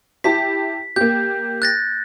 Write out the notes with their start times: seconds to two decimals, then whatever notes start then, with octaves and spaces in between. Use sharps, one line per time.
0.24 E4 G4 A5 B6
0.96 A#3 G4 G6
1.62 F#6 A6 A#6